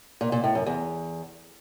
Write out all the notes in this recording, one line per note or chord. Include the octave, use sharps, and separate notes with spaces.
A#2
A#2
A2
F#2
E2